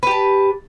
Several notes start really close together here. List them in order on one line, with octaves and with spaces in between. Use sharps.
B4 G4 A5